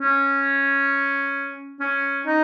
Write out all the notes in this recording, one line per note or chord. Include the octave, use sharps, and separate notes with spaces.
C#4
C#4
D#4